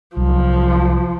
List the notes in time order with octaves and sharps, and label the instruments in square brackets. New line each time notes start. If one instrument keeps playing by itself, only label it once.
[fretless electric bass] C2 F#3 [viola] F3